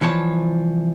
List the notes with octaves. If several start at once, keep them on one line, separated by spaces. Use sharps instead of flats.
C2 E3 F3 C#5 A5